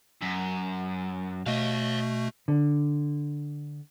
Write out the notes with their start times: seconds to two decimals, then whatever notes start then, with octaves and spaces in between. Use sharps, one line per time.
0.22 F#2
1.46 B2 A3 D#5 F5
2.48 D3